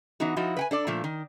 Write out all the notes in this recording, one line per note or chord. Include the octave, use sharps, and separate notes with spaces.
E3 B3 D#4 F#4
F3 D#4 E4 F#4
B4 G5 G#5
D4 A4 D5
A#2 F3 A3
D#3